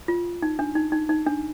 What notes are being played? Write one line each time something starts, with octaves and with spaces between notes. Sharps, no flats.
F4
D#4
D4
D#4
D#4
D#4
D4